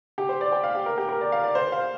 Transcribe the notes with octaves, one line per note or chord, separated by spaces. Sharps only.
G4
C5
D5
G5
F5
G4
A#4
G4
A#4
D5
F5
D5
C5
F5